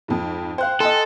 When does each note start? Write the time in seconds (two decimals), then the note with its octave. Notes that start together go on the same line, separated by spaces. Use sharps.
0.08 F2 G#2
0.58 C5 F5 G5 F#6
0.80 A4 D#5 G#5 C6